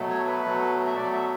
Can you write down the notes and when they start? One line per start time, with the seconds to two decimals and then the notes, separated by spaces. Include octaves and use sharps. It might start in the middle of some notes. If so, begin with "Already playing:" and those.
Already playing: B2 F#3 A3
0.10 C#5
0.27 B4
0.45 B2 F#3 A3
0.87 E5
0.96 B2 F#3 A3 D5
1.13 E5